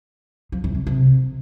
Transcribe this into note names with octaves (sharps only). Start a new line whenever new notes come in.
F3
E3
C3
C3